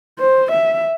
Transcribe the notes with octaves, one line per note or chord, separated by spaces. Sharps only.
C5
E5